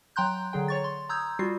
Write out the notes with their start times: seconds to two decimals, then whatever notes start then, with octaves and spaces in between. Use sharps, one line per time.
0.16 F#3 G5 A#5 C6 F#6 G6
0.53 D3 F#3 G#4 G5
0.68 C#5 C#6 A6
0.84 C6
1.09 A#5 D#6 E6 G6 G#6
1.39 G3 F4 F#4 C7